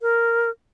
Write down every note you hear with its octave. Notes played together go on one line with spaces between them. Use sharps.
A#4